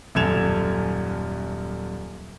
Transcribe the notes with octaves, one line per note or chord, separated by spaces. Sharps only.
D#1 F#2 A4 G#6 E7 F7